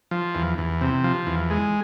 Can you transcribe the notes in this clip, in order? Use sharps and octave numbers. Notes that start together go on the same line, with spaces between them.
F3
E2
E2
C3
F3
E2
G#3